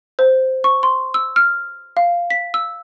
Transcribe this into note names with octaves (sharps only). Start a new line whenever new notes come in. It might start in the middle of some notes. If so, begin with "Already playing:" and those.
C5
C#6
C6
E6
F6
F5
B6
E6